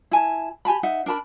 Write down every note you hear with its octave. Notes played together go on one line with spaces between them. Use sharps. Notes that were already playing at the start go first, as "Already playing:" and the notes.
E4 G#5 A5
G4 G#5 A5 B5
D#4 E5 F#5
D4 A#4 A5 B5